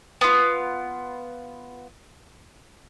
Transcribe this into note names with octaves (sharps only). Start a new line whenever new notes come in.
B3 F4